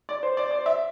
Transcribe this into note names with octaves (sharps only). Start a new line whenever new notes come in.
D5
C5
D5
D5
E5